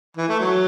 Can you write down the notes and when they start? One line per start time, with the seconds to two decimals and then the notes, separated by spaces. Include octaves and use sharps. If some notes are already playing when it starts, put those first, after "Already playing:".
0.17 E3
0.29 A3
0.40 F#3